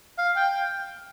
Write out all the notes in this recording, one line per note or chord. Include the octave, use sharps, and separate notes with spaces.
F5
G5